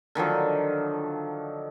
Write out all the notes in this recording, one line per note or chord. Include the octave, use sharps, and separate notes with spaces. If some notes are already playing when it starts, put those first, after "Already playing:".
D3 D#3 F3 F#3